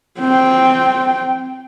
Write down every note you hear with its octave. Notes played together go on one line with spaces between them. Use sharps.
C4 G5